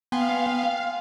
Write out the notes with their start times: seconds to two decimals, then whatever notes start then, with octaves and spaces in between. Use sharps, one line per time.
0.12 B3 F5 G5 G#5 C6